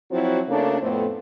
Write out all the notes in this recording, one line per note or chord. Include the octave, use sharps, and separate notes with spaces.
F3 F#3 C4 E4 F#4
C#3 A3 A#3 D4
F2 A2 A3 B3 C4